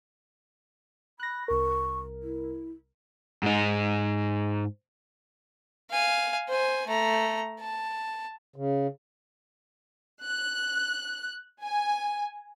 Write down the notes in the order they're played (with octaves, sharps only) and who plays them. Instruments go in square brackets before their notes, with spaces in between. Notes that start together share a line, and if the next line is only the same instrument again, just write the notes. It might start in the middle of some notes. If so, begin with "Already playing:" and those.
[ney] B5 [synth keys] F#6 A#6
[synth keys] C2 A#4 [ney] C#6
[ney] E4
[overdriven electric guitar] G#2 D#4
[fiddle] F5 G#5
C5 G#5
A3 A#5
A5
[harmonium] C#3
[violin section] F#6
G#5